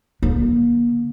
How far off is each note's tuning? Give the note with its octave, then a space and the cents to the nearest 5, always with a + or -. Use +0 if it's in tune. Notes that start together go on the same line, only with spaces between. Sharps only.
D3 +0 A#3 +30